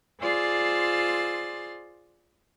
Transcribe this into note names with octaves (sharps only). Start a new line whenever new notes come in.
F4 G#4 C5 D5 C6 E6